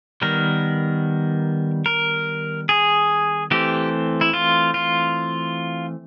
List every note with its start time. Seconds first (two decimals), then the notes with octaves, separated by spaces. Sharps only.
0.22 D#3 G3 B3 A#4
1.86 A#4
2.69 G#4
3.51 E3 A3 C4 G4
4.21 E4
4.34 F4
4.74 F4